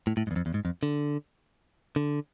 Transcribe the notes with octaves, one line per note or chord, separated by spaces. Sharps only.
A2
A2
G#2
E2
F2
E2
G#2
F2
D3
D3